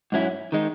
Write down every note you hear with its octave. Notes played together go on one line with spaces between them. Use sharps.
G#2 F#3 C#4 E4
D#3 G#3 D#4